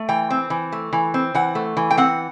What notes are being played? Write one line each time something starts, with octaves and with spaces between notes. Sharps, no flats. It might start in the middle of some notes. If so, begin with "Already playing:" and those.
Already playing: A3
E3 G5
C4
E3
A3
E3
C4
E3 F#5
A3
E3
G5
C4 F#5